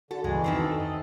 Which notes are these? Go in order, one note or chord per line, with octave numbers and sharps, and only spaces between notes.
D3 F#4 A4
C#2 G2 B2 E3 G#3
F2 D#3 A3 C4
A4
D#5